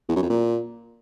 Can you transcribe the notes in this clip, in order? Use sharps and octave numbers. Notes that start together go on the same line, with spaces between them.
E2
F#2
F2
A#2